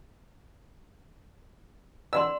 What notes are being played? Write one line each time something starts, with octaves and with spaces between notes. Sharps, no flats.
D5 F#5 C6 E6